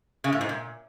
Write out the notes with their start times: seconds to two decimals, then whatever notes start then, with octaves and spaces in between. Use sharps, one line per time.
0.24 C#3
0.32 A2
0.41 G#2
0.49 A#2